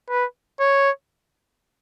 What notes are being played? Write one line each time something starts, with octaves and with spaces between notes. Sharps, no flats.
B4
C#5